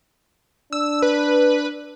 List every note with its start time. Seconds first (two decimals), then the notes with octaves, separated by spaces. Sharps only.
0.72 D4 E6
1.02 B4